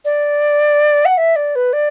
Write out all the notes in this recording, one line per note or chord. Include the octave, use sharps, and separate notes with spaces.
D5
F#5
E5
D5
B4
D5